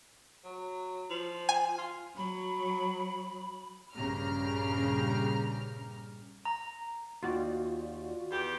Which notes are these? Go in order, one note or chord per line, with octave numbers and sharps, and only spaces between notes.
F#3
F3
G#5
F4
F#3 B5
A#1 G2 C#3 G4 A#5 F6
A#5
D#2 F4 F#4 D5
E2 G4